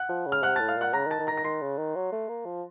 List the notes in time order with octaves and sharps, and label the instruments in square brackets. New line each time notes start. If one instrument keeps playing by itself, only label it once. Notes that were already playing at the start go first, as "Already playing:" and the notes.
Already playing: [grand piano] F#5 F#6
[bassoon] F3
C#3
[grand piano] F6
[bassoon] C3 [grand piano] F#5 F#6
[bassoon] A2 [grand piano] A5 A6
[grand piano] F5 F6
[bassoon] A#2 [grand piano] F#5 F#6
[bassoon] C#3 [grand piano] A#5 A#6
[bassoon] D#3
[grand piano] A5 A6
[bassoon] D#3
[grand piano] A#5 A#6
[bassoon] D#3
[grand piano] A#6
[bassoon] D#3 [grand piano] C6 C7
[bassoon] C#3
D#3
F#3
A3
A#3
F3